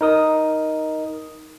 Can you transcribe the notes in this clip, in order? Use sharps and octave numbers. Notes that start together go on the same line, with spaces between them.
D#4 A#4 D#6